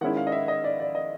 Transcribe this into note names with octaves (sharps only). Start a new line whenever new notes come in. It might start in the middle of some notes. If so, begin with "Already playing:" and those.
D#3 G#3 C#4 E4 F#5
F5
D#5
E5
D#5
D5
D5
D#5